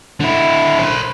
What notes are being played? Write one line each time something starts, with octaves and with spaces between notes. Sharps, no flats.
D3 E4
C5 B5